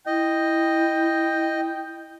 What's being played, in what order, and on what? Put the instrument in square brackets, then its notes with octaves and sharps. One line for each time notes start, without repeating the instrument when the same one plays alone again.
[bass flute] E4 [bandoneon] D#5 [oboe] G5